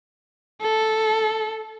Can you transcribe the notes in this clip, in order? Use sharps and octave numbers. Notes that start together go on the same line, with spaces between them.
A4